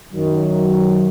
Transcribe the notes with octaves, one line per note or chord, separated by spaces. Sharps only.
F#2 D#3 F#3